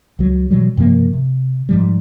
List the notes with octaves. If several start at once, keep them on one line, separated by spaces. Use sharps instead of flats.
C#2 F#3
B2 E3 F#3 G3
G2 C3 F3 A#3
C3
G#2 F3 G3